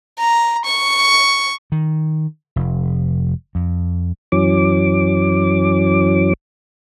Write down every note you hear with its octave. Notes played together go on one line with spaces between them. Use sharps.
A#5
C#6
D#3
F1
F2
F#2 E3 F#3 C#4 D6